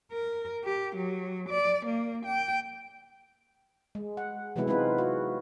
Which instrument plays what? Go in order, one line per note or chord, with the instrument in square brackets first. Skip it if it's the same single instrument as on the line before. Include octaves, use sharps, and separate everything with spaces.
[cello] A#4
G4
F#3
D5
A#3
G5
[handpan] G#3
F#5
C3 E3 F#3 G#3 B3 E4
G#3 C4 D#4 F4 B4
F#4